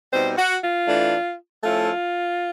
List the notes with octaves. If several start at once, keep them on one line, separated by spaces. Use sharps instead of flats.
B2 G3 C4 D#4 C5
F#4
F4
E3 A3 D4
F3 A3 C#4 E4 F4